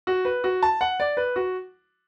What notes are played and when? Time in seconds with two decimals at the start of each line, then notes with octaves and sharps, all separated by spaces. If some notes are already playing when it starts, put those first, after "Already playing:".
0.07 F#4
0.25 B4
0.44 F#4
0.63 A5
0.81 F#5
1.00 D5
1.17 B4
1.36 F#4